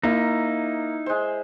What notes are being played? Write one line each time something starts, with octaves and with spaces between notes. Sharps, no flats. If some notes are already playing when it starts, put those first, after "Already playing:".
A#3 D#4 E4
G#3 C5